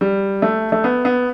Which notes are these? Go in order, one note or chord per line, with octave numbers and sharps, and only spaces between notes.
G3
A3
A3
B3
B3